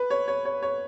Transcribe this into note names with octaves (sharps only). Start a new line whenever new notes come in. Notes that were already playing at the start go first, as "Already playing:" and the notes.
Already playing: B4
C#5
C#5
C#5
C#5